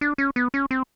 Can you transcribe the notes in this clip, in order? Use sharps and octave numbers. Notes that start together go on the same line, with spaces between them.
D4
C#4
B3
C#4
C4